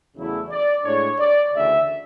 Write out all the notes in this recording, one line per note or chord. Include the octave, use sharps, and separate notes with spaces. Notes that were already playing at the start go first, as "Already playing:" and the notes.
E2 C#3 F#3 A3 E4
D5
A2 G#3 D4 C#5
D5
D2 C#3 E3 E5